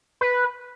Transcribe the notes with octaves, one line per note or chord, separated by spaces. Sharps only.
B4